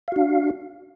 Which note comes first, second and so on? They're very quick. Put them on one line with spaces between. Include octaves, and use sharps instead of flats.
F5 F#4 D4